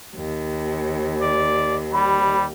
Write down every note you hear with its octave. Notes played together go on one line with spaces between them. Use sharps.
D#2
D5
G3 B5